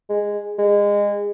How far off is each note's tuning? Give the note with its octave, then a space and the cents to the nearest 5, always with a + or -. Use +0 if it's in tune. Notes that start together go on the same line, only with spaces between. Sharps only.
G#3 -10
G#3 -25